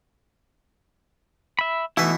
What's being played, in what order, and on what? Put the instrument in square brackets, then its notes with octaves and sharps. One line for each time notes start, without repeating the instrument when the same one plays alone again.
[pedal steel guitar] E5 B5
[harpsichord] B2 E3 E5 [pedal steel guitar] A3 D#4 E4